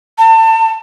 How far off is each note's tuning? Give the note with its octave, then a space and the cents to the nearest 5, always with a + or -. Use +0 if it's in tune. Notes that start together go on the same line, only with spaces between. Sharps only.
A5 +35